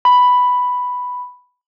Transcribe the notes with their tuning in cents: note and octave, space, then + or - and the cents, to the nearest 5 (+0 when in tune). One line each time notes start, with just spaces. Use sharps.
B5 +5